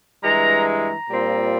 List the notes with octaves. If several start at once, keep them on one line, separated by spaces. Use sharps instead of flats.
G2 E3 G#3 A#5
A#5
A#2 G3 C4 F4